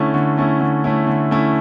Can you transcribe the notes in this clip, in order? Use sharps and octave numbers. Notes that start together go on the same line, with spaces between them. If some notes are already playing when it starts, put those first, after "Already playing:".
Already playing: D3 A3 C#4 E4
D3
A3 C#4 E4
D3
A3 C#4 E4
D3
A3 C#4 E4